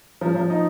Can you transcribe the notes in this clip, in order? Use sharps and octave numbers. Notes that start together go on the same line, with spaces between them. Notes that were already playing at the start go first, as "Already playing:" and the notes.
F3
F3
D#4